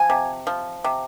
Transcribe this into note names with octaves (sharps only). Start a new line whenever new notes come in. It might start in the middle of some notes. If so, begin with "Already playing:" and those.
Already playing: F3 G#5
C3
F3
C3